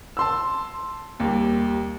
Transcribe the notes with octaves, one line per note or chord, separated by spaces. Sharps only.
A5 C6 E6
D#2 G3